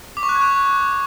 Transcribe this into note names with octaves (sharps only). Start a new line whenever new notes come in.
D6
C#6
F#6
G#6
F#6